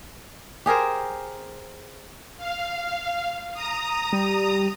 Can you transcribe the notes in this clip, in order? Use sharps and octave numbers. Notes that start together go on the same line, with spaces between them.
G4 G#4 A#4 C5
F5
A#5 D#6
G3